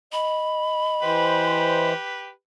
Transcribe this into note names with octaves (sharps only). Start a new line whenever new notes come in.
D#5 B5
E3 G4 B4 C5